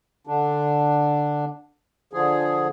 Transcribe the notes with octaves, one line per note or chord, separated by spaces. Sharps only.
D3 D4
D3 F3 G#4